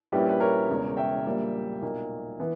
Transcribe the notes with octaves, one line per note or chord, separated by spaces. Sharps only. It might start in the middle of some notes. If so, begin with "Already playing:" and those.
A#1 A#2 G3 C#4 E4 G4 B4
B4
A#4 C#5
E1 E2 C#3
E5 G5
A#1 A#2 G3 A#3
B1 A#2 A#3
E3 B3